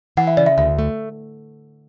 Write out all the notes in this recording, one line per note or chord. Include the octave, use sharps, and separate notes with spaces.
E3 F#5
E5
C#3 D5
E5
D2 E5
A3